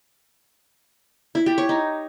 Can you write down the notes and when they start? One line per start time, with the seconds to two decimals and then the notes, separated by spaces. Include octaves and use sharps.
1.35 E4
1.46 G4
1.58 C#5
1.69 D#4